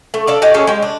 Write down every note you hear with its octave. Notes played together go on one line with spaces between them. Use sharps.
A3
A4 D5 F5
F#4 G4 D5 D#5
C#4 G#4 A4 C#5
G#3 G4
D4